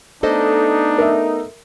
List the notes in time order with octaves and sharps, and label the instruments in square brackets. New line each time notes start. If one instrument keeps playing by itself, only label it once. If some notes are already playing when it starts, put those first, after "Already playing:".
[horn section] A3 B3 D#4 [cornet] D4 [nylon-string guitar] A4 C5 D#5
[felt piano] A#4 E5